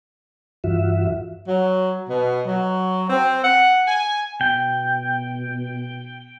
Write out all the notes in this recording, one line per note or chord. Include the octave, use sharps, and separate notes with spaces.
G2 E3 F4 F#4 E5
F#3
B2
F#3
C4
F#5
G#5
B2 G5